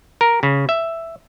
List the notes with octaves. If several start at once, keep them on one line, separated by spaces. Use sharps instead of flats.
A#4
C#3
E5